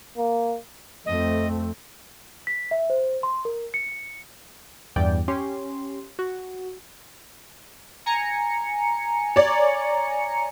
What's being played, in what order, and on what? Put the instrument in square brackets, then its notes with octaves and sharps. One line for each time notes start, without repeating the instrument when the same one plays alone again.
[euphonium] A#3
[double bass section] F2 A3 C4 [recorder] D#5
[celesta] B6
E5
C5
C6
A#4
C#7
[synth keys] E2 G2 D5 G5
C#4 G4 C6
F#4
[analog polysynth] G#5 A#5 C#7
[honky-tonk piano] C#5 D5